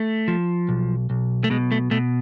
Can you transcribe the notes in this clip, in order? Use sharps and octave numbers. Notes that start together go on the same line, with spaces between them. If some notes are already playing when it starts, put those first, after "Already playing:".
Already playing: A3
F3
B1
B1
A3
B2 G#3
A3
B2 A3